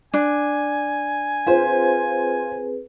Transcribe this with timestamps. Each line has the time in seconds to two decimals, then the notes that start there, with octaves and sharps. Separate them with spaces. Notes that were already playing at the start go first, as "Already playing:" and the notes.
0.14 D4 G#5
1.47 C4 F4 G#4 B4 C5